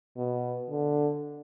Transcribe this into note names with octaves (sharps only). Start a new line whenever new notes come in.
B2
D3